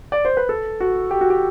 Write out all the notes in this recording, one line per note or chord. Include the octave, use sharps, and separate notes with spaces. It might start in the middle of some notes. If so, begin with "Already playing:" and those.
D5
C5
B4
A4
F#4
G4
F#4
G4